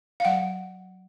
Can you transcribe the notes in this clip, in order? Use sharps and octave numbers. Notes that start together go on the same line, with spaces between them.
F5
F#3 F#5